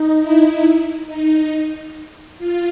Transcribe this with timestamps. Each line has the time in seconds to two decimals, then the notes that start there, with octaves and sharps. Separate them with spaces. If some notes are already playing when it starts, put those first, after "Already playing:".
Already playing: D#4
0.20 E4
1.07 D#4
2.38 F4